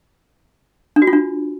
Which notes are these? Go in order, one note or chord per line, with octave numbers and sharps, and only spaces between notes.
D4
F#4
F4
D4